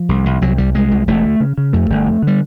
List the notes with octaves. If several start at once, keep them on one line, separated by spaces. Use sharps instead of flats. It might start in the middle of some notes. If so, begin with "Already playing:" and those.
Already playing: F3
C2
C2
C2 F#3
C2 G3
C2 G#3
C2
E1 A3
D2
C#3
C#3
F2 A3
G1
F2
D3 G3